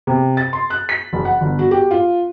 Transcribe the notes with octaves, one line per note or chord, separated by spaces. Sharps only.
C3
A6
C6
F#6
B6
F#1
F#5
G1
F#4
G4
F4